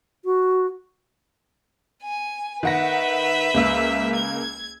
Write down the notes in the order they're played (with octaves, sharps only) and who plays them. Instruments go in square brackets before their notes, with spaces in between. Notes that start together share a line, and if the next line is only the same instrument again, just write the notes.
[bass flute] F#4
[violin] G#5
[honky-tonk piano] D#3 F#5 A#6 [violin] B4 E5
[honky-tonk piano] C#2 A#3 E6
[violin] G#6